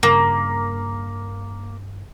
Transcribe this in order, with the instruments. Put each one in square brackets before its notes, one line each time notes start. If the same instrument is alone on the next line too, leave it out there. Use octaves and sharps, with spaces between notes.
[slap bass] G2 C#3 [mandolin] A#3